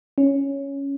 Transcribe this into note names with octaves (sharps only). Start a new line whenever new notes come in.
C#4